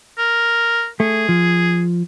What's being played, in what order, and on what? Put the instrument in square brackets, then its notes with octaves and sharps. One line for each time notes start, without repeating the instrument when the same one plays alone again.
[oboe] A#4
[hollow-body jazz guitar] A3 [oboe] G#4
[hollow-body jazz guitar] F3